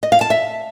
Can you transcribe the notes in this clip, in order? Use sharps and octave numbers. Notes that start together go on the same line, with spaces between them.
D#5
F5
A5
E5